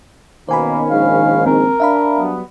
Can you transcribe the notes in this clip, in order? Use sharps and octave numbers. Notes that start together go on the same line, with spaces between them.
B2 D#3 A#3 C#4 C5 G#5 B5
A#1 G#2 F5
C4 A#4
D4 E5 F5 B5
F#3 G3 B3